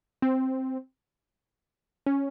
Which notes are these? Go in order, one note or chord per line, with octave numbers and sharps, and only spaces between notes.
C4
C#4